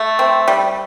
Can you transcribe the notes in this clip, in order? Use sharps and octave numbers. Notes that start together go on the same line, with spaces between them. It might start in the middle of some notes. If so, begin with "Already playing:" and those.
Already playing: A3
C4
G3